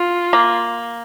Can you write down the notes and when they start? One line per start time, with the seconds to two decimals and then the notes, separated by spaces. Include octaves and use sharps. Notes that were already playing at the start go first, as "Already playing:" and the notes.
Already playing: F4
0.33 A#3